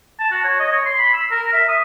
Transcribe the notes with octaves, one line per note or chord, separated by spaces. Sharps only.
A5
F#4
C#5
D#5
C#5
C6
B5
E6
A#4
E5
D#6